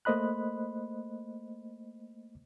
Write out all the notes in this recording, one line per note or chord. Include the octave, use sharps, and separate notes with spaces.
A3 A#3 C5 D#5 B5 F#6